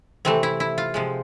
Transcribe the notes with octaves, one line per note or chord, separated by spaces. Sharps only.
C3 E3 A3 C4
E4
E4
F4
C3 F3 G#3